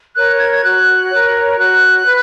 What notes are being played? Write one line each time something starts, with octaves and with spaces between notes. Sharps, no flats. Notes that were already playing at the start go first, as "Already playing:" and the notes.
A#4 C#5 F#6
G#6
G#6
F#4 F#6
A#4 C#5
F#4 F#6
B4